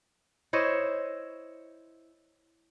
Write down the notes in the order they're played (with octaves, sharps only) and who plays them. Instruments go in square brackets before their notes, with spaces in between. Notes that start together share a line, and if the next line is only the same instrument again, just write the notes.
[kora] E4 C5 C#5 D#5